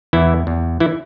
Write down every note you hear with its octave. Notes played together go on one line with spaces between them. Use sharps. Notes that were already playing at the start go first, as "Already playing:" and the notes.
E2 E3 E4
E2
E3 E4